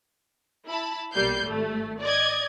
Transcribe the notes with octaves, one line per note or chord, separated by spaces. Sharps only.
E4 A5 B5
B1 G3 A#3 G6 C7
G#1 A3
D5 D#5 G#6